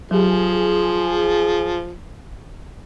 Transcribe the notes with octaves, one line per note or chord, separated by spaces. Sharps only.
F3 F#3 F4 G4 G#4